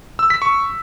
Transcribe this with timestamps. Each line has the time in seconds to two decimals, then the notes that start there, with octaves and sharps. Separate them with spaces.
0.19 E6
0.30 B6
0.42 C#6